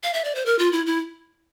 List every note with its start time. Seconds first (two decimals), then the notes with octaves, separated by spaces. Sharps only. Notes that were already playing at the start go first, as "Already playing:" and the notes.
0.03 F5
0.14 E5
0.24 D5
0.35 C5
0.46 A#4
0.59 F4
0.72 E4
0.86 E4